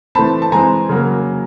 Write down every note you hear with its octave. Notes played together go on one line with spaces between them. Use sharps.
E3 A3 C4 A5 B5
A5
E3 G#3 C4 G#5 A#5
C#3 F#3 A#3